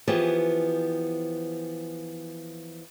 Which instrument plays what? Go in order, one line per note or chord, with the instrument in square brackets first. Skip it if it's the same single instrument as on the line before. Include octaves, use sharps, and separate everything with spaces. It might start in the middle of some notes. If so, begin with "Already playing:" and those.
[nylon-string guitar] E3 F3 B3 G4 G#4